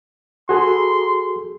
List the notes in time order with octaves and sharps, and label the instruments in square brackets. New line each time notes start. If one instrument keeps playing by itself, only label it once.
[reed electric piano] F#4 G#4 A4 [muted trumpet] C6